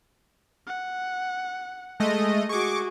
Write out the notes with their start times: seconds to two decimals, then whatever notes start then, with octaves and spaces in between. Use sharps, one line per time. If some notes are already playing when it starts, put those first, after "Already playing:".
0.67 F#5
2.00 G#3 A3 D#5
2.49 F#4 G#4 C#6 D6